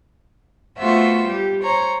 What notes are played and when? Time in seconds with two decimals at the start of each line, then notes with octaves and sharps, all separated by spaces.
0.79 A3 B3 F4 F#4 C5 E5
1.28 G3 G4
1.63 C5 C#5 A#5